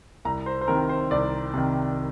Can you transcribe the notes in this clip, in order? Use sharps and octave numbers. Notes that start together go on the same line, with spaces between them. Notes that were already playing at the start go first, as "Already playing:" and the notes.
C2 A#5
C5
C5
C3 D#3 A#4
C5
C2 D5
C3 D#3